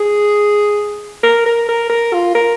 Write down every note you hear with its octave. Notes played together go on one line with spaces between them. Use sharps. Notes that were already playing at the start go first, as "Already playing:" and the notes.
Already playing: G#4
A#4
A#4
A#4
A#4
F4
A#4